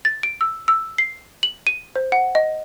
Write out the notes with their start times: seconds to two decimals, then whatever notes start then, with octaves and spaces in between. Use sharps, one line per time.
0.05 A6
0.23 D7
0.41 E6
0.68 E6
0.98 C7
1.43 F#7
1.67 D#7
1.96 C5
2.12 F#5
2.35 D#5